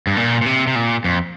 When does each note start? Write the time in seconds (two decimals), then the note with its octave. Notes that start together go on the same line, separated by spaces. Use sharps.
0.07 G2
0.17 A#2
0.41 A#2
0.46 C3
0.67 C3
0.75 A#2
1.04 F2